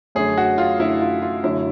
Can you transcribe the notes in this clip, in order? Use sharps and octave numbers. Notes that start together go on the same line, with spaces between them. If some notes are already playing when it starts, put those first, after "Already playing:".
F#2 D3 F#3 A3 C#4 G#4
F#4
F4
F#2 D3 F#3 A3 C#4 E4
F4
F4
F#2 D3 F#3 A3 C#4 E4